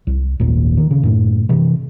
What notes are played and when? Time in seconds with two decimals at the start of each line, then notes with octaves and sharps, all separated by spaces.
0.07 C2
0.40 D#1 G#1 D#2 A#2
0.77 D#3
0.91 C#3
1.03 F#2 A2
1.49 C3 E3